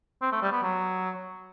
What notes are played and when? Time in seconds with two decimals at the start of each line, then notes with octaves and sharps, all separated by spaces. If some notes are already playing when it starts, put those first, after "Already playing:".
0.22 C4
0.32 A3
0.42 G3
0.52 B3
0.63 F#3